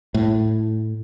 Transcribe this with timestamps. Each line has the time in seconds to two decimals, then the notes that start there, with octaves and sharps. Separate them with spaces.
0.14 A2